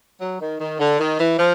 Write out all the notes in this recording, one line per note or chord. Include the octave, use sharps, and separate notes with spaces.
F#3
D#3
D#3
D3
D#3
E3
F3